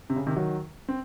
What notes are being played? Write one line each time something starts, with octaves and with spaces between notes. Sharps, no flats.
C3
C#3
C3 D#3
D#3 F#3
C4